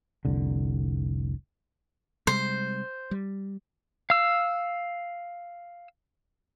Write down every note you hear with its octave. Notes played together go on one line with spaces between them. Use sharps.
F1 C2 D3
C3 G3 G#3 C5
G3
F5 E6